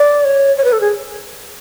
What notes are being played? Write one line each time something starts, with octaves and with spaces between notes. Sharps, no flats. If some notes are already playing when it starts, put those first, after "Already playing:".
Already playing: D5
C#5
C#5
B4
A4
G#4